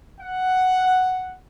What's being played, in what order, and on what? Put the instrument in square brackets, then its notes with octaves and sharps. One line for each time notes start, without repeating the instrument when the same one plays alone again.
[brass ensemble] F#5